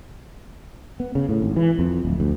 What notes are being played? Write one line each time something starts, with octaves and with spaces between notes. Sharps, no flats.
B3
C#3
A2
G#1
E3
F2
D1
D2